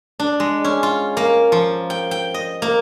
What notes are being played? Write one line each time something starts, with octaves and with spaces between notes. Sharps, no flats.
D4
G#3
C#4
F4
A#3
F3
G5
G5
D#5
A#3